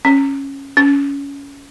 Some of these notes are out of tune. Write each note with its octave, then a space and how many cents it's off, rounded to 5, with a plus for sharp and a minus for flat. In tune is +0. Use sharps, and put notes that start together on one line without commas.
C#4 -10
C#4 +20